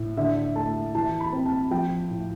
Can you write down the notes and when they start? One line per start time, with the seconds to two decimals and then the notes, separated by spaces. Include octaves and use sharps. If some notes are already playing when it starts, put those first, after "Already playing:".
Already playing: A2
0.17 D3 E5
0.55 A3 A5
0.95 E3 A5
1.20 B5
1.32 C4
1.46 A5
1.71 F3 G5
2.10 A2